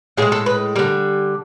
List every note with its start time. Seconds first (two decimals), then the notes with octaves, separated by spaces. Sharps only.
0.17 A2 F3 G#4
0.22 G#3
0.32 A4
0.46 B4
0.76 G3 A#4
0.79 D3